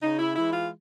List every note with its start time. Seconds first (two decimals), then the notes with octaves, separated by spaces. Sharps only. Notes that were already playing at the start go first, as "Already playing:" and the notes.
0.02 C#3 D#4
0.19 E4
0.36 E3 G#3 E4
0.53 F4